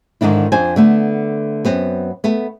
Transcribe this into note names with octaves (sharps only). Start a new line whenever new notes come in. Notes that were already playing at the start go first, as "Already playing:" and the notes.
G#2 D3 D#3 D4 E4
F2 D4 C5 G#5
D3 A3 B3
F#2 B3 C4
A3 B3